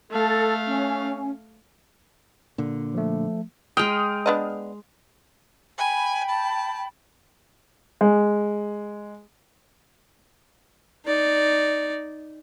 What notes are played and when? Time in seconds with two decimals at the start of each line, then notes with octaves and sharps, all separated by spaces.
0.11 A3 A4 F5
0.66 C#4
2.58 A#2 D3
2.94 F3 A3
3.77 G#3 G5 D#6 F6 F7
4.26 B3 D4 D#5
5.78 G5 G#5 B5
6.30 A5
8.01 G#3
11.06 D#4 D5